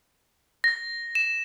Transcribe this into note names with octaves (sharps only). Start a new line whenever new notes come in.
A#6
E7